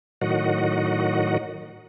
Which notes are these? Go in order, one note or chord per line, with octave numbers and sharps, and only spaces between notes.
A2 D#3 F#3 F#4 D#5 F#5